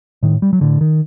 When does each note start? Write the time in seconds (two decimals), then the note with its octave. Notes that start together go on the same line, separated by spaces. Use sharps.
0.23 A2 D#3
0.42 G3
0.53 F#3
0.61 A2 D3
0.81 D#3